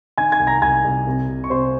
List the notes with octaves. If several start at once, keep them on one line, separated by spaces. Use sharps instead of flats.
D#3 G#5 G#6
G#5 G#6
C2
A#5 A#6
C2 G#5 G#6
C2
C3
C3
C#6
C3 C5 C6